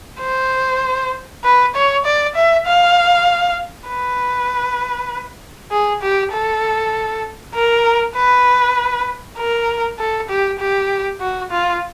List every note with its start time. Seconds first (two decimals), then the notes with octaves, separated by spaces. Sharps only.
0.21 C5
1.44 B4
1.75 C#5
2.05 D5
2.35 E5
2.67 F5
3.88 B4
5.71 G#4
6.02 G4
6.33 A4
7.55 A#4
8.16 B4
9.38 A#4
9.99 A4
10.30 G4
10.60 G4
11.21 F#4
11.51 F4